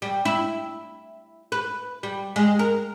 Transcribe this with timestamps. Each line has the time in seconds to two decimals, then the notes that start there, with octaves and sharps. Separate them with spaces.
0.02 G3
0.25 E4
1.52 B4
2.03 G3
2.36 G#3
2.59 A#4